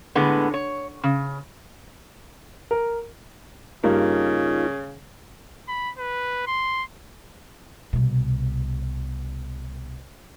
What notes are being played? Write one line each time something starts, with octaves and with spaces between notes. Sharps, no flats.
A2 D3 G#3 B3
C#5
C#3
A#4
G2 C#3 A#3 D#4 F4
B5
B4
C6
C2 B2